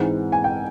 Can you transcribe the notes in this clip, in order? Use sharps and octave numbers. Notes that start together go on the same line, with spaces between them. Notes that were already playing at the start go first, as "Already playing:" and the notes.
Already playing: G#2 E3 G#3 C4 F#5
G#5
G5